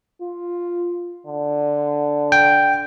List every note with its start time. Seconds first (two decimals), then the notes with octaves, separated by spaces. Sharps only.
0.22 F4
1.27 D3
2.32 G5